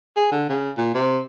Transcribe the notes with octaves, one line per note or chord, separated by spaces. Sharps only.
G#4
D3
C#3
A#2
C3